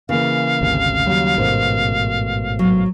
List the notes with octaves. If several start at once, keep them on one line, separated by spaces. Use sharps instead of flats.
C#3 E3 A#3 A#4 F5
G#1 D2 C3
D#2 F#3 G3
A1 G#2 B2 A#4 C5
F#3